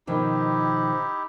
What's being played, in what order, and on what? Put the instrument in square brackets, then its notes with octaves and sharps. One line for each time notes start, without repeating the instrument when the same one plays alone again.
[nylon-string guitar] B2 D#3 F3 [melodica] D#4 E4 G4